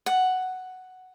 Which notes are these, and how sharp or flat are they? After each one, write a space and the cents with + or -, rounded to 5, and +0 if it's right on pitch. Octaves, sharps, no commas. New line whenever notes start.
F#5 +5